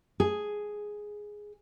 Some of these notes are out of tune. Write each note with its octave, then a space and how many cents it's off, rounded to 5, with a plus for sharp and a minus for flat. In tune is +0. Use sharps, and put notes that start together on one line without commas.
G#4 +0